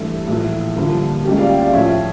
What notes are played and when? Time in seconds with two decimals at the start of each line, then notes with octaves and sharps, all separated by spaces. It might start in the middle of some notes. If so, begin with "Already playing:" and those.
Already playing: G2 E3 A3 A4
0.27 A#1 A2 E3
0.76 G2 D3 F3 A#3
1.24 C#2 C#3 G3 A#3 C#4 G4
1.37 D5 F5
1.49 E5 G5
1.61 D5 F5
1.73 A#1 A2 F3 C#4 C#5 E5